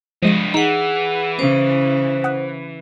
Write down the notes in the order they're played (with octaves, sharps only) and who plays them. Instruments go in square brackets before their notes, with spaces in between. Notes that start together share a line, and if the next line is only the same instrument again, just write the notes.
[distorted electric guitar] G2 D#5 [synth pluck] F3 G#3 D#7
[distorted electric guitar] E3 [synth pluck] D#4 [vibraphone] G#4 F#5
[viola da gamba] C#3 [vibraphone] C5
[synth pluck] F#5 D#6 F#6